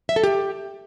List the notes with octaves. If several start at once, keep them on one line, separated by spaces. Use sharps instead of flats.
E5
A4
G4